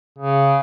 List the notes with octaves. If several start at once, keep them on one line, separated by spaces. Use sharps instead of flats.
C#3